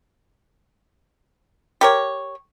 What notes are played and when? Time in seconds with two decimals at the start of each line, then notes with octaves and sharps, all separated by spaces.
1.81 G4 A#4 C#5